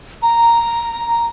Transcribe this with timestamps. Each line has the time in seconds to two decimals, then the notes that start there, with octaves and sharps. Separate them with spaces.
0.22 A#5